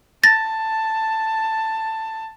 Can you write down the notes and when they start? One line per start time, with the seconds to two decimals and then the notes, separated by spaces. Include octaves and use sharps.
0.24 A5 A6 A#6